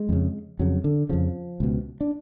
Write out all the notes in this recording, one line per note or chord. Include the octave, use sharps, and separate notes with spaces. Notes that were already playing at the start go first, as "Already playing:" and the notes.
Already playing: G#3
F2 C#3
F2 C#3 F#3
D3
F2 C#3 F3
C#2 B2
D4